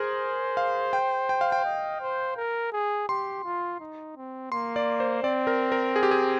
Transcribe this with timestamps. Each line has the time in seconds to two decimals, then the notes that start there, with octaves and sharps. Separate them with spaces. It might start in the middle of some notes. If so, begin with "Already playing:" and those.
Already playing: G#4 A#4 C5
0.57 F5
0.93 G5
1.29 G5
1.41 F5
1.52 G5
1.65 D#5
2.01 C5
2.37 A#4
2.72 G#4
3.08 G4 C6
3.44 F4
3.81 D#4
4.17 C4
4.52 A#3 C6
4.76 D5
5.00 C5
5.23 C4 D5
5.47 A#4
5.72 A#4
5.96 G#4
6.03 G4
6.11 G#4